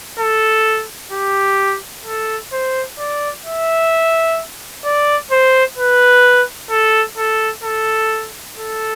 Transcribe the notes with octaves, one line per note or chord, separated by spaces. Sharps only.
A4
G4
A4
C5
D5
E5
D5
C5
B4
A4
A4
A4
A4